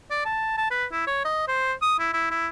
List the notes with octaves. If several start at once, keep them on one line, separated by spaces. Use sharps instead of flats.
D5
A5
A5
B4
E4
C#5
D#5
C5
D#6
E4
E4
E4